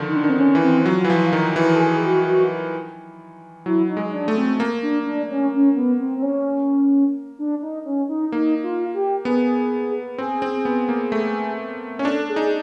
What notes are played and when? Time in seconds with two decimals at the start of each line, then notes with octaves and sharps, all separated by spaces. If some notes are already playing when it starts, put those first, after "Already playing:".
Already playing: D3 D#3 F3
0.09 D#4
0.16 D4
0.24 D#3
0.29 C4
0.39 C#4
0.55 E3
0.63 C4
0.86 F#3 F4
1.04 E3 E4
1.09 F3 F4
1.32 D#3 A#4
1.56 E3 A#4
1.75 A4
1.79 G#4
2.03 F#4
2.26 F#4
3.66 F#3 E4
3.89 D#4
3.97 G#3
4.12 D4
4.28 A3
4.36 C4
4.60 A#3
4.82 D4
5.06 D4
5.30 C#4
5.53 C#4
5.75 B3
5.99 C4
6.17 C4
6.22 C#4
7.39 D4
7.62 D#4
7.85 C#4
8.09 D#4
8.32 A#3 D#4
8.63 F4
8.94 G4
9.25 B3 G#4
10.18 C4 G#4
10.42 C4
10.65 B3
10.89 A#3
11.12 A3
11.99 C#4
12.05 D4 A4
12.29 G#4
12.36 D#4